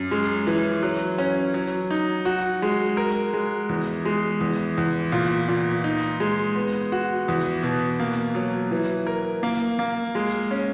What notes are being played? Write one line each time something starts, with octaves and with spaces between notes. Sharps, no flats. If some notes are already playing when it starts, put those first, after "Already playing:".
Already playing: F#2
G#3
E3
F#3
C#4
F#3
D#4
F#4
G#3
A#4
G#3
E2
G#3
E2
E2
A#2
A#2
D#4
G#3
B3
F#4
E2
B2
A#3
F#3
E3
A#4
A#3
A#3
G#3
C#4